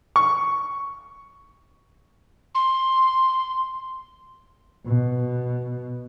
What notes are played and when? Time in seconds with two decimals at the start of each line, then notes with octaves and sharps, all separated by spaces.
0.16 C#6
2.55 C6
4.86 B2